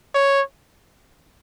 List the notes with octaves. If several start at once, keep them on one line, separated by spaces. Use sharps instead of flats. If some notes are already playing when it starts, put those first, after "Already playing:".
C#5